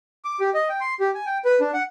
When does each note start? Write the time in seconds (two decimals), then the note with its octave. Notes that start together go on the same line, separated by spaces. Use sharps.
0.25 D6
0.40 G4
0.54 D#5
0.69 G5
0.81 C6
1.00 G4
1.15 G#5
1.26 G5
1.45 B4
1.61 D4
1.74 F#5